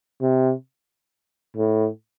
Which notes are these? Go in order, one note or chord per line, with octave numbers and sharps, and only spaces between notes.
C3
A2